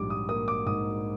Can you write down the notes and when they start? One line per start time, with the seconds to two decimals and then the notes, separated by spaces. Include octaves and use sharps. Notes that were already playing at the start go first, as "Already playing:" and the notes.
Already playing: A#1 G#2 G3 D6
0.10 D#6
0.29 A#3 D#6
0.48 D6
0.66 G#2 D#6